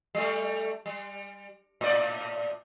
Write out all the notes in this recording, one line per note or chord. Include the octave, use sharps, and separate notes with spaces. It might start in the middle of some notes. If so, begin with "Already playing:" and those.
G3 A3
G3
A2 D5